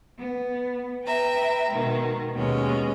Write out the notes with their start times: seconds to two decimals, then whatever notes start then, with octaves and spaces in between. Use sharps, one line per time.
0.20 B3
1.05 B4 E5 G5 A#5
1.71 B2 D#3 G#3
2.36 D#2 B2 G#3 C#4 D#5